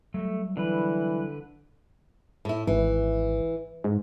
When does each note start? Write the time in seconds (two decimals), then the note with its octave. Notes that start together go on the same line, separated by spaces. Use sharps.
0.14 F#3 G3 A3
0.57 D3 E3 B4
2.45 A2 E4
2.67 G#1 E3
3.84 G#2